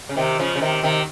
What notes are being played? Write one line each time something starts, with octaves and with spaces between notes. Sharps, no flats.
C#3
C3 D#3
C#3 F3
C#3
C3 D#3
C3 D#3